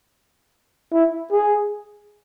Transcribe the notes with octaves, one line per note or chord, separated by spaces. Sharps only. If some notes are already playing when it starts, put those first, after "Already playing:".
E4
G#4